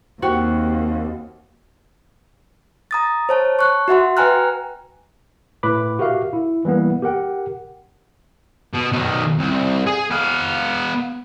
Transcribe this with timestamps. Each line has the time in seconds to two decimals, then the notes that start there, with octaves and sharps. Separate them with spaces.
0.22 D#2 C4 F#4 G4
2.91 A#5 D#6 A6
3.29 C5 C#5 A5
3.59 C#6 F#6
3.88 F#4 E5 F#5 C6
4.17 B4 G5 G#5 A#5 F6 F#6
5.63 A2 B4 B5 D6
5.99 F#4 G4 A#4 E5 F5
6.33 E4
6.65 E3 G3 A#3 B3
7.02 G4 A#4 F#5 G5
8.74 B2
8.92 B1 D#3
9.39 C2
9.87 G#4
10.10 B3 F5